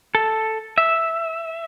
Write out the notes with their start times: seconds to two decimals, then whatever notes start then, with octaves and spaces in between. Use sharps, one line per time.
0.15 A4
0.78 E5